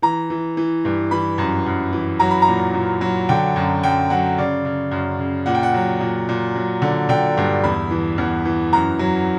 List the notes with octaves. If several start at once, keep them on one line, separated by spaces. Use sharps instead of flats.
E3 A#5
E3
E3
G2
E3 B5
F#2
F#2
E3
F#3 A#5
B5
A#5
A#2
A#2
F#3
D3 G5
F#2
F#2 G5
F#3 F#5
C#3 D5
C#3
F#2
C#3
A#2 F#5
G5
F#5
F#3
A#2
A#2
F#3
D3
D3 G5
G2
E2 B5
E3
E2
E3
F#2 A#5
F#3